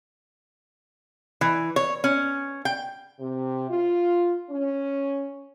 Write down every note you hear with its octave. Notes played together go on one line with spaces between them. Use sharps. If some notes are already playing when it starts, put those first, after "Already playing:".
E3
C#5
C#4
G5
C3
F4
C#4